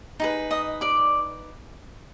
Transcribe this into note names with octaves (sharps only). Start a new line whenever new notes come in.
D#4 G#4 B4
D#5 D#6
D5 D6